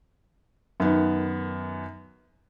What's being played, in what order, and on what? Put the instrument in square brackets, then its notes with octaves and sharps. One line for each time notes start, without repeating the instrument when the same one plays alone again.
[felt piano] F#2 D#3 B3